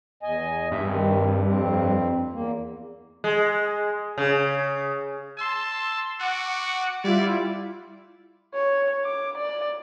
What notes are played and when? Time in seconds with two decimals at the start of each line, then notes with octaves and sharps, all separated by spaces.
0.23 E2 D#5 G#5
0.72 G2 E5
0.87 D#3 C4
1.47 F2 C4
2.33 E2 A#3
3.24 G#3
4.18 C#3
5.38 A5 C6 E6
6.20 F#4 F#5 D6 C#7
7.04 G3 E4 F4 D5
8.54 C#5
9.05 D6
9.38 D5